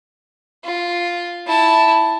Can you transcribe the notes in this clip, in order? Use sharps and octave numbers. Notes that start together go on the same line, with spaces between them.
F4
E4 A5